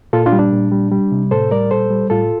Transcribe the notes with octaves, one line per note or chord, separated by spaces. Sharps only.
A#2 F4 A4
D4 F4
G3
D4
A#2
G3
G3
C3
A2 A4 C5
G3 A#4 D5
A#2 A4 C5
G3
A2 F4 A4